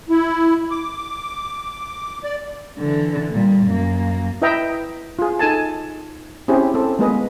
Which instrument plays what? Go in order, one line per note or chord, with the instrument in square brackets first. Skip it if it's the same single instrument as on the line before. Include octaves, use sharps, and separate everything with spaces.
[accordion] E4
D6
D5
[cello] D3 E3
A#2 G3
F#2 A#3
[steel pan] E4 B4 D#5 E5 G5 A#5
F4 G#4
D#4 A4 G#5 A5
C4 C#4 E4 G4 G#4
C4 A4
G#3 A#3 B3 G#4 B4 D#5